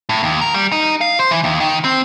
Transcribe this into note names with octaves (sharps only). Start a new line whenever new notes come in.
A2
D#2
A#4
G3
D#4
F5
C5
E3
D#2
D#3
C4